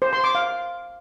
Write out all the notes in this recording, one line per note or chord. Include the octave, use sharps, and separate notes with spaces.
C5
C6
D6
F5